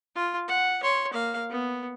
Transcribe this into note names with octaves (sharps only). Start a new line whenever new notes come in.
F4
F#5
C#5 C6
A#3 F5
B3